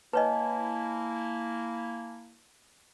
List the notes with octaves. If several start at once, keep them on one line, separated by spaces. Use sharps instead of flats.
A#3 E4 B4 C#5 D#5 G#5 A5